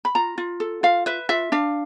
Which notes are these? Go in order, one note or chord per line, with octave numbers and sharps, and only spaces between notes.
B5
F4 A#5
F4
A4
F4 F5
B4 E5
F4 E5
D4 F5